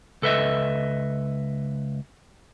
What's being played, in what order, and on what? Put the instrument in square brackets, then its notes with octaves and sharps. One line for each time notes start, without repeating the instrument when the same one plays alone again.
[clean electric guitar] C#2 A4 B4 D#5 E5